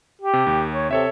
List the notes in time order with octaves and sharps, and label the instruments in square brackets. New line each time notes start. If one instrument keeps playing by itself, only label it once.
[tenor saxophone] G4
[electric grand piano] C3
D#2
[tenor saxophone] C#5
[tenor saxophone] C3 [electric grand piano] A4 C#5 E5